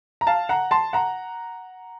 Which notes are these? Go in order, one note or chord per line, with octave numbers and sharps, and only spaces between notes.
A#5
F5 A5
F#5 A#5
A5 C6
F#5 A#5